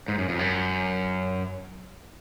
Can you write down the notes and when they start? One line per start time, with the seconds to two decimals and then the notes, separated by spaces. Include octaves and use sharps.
0.08 G#2
0.18 F#2
0.29 F2
0.39 F#2